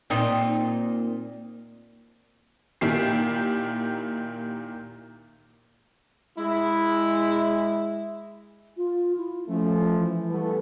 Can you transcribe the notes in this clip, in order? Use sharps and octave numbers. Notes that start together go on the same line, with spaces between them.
A#2 C4 D#4
A#2 D#3 E4 G4 C7
G#3 E4
F4
E4
F3 A3 C#4
E3
G3 A3 B3